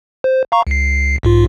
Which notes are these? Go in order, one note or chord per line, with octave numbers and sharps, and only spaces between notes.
C5
F5 A#5 C#6
C#2 C7
B1 G#2 F4